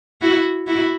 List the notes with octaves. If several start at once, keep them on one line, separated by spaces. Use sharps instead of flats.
E4 F#4
E4 F#4